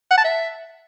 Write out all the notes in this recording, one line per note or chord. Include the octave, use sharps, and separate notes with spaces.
F#5
A5
E5